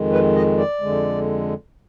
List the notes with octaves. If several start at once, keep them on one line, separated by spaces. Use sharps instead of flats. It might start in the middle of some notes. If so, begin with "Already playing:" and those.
Already playing: F2 D#3 G#3
B4
D#5
D5
F2 D3 G#3